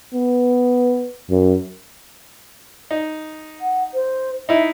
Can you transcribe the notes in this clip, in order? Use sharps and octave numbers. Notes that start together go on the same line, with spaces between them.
B3
F#2
D#4
F#5
C5
D#4 E4 E5